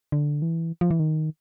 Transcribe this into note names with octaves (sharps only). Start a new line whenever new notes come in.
D3
E3
F3
E3
D#3